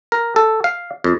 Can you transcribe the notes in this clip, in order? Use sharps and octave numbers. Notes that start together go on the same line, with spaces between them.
A#4
A4
F5
F2